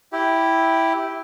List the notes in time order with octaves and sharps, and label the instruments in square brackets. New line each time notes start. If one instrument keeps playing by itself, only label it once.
[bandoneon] E4 G4